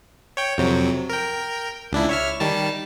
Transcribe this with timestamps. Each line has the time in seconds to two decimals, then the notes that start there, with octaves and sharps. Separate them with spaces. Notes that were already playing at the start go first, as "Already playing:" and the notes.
0.37 C#5 G5
0.58 F2 C3 F#3
1.09 A#4 G5
1.92 C#2 D4 E4
2.09 C#5 E5 F6
2.40 D#3 G3 A5